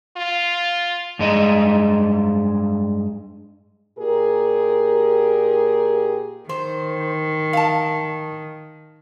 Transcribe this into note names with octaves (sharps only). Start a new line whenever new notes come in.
F4
G2 G#3 D#5
A#2 G4 G#4 A#4
D#3 C5
F5 A5